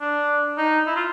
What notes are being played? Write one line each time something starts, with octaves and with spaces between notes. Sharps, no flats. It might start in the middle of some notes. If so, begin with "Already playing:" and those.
D4
D#4
E4
F4